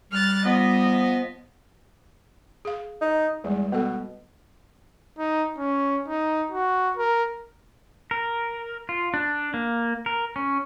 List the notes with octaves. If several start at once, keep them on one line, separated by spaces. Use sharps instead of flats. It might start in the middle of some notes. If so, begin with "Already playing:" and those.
G3 F6 F#6 A6
F3 B3 D#5
G#4 F5
D#4
E2 G3 G#3
B2 B3 A4
D#4
C#4
D#4
F#4
A#4
A#4
F4
D4
A#3
A#4
C#4